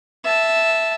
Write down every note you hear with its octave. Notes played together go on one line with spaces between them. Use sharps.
E5 A5